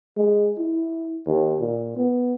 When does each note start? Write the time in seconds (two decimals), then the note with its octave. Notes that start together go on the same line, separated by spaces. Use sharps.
0.16 G#3
0.58 E4
1.26 D#2
1.60 A#2
1.96 B3